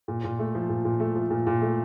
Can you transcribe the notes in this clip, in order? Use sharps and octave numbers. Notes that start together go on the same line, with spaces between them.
A#2
A#2
A3
F3
A#2
A#2
A3
F3
A#2
A#2
A3